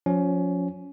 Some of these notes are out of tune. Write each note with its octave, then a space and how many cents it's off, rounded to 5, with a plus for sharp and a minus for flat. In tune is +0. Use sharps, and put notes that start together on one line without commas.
F3 +35 C#4 +20